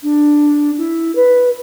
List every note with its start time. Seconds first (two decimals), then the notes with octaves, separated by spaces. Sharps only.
0.03 D4
0.78 E4
1.16 B4